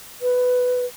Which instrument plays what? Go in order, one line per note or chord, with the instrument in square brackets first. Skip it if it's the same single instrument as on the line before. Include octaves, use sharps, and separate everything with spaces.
[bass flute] B4